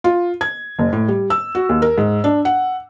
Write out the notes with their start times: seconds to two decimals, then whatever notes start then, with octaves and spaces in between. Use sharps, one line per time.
0.04 F4
0.41 G#6
0.79 F#1
0.93 A2
1.08 G3
1.30 E6
1.55 F#4
1.69 D#2
1.82 A#4
1.98 G#2
2.24 D4
2.45 F#5